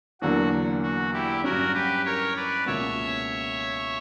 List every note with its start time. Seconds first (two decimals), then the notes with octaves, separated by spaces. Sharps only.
0.21 E2 D3 F#3 A#3 D4 F#4
0.82 F#4
1.14 E4 G4
1.44 G2 F#3 C#4 F#4 A#4
1.74 G4 B4
2.05 A#4 C#5
2.36 B4 D5
2.66 C#2 B2 A#3 C#4 F#4 C#5 E5